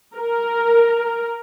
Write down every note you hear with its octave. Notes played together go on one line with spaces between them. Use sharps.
A#4